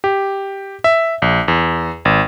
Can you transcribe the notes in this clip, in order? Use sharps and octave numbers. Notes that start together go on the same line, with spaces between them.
G4
E5
A#1
E2
G#1